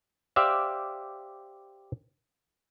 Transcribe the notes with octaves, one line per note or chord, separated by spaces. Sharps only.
G4 C5 D5 E5 F5